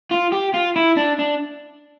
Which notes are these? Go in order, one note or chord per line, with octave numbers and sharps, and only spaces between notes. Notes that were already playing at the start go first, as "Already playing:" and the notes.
F4
G4
F4
E4
D4
D4